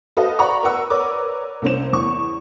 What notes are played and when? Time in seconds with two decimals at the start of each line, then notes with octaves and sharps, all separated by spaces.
0.17 F#4 A4 B4 C5 D#5 F5
0.39 D5 F#5 A#5 B5 C#6
0.63 A#4 B4 F#5 E6
0.90 A#4 B4 C#5 D5 D6
1.62 C2 A#3 C#4 C5 E7
1.93 E2 C#6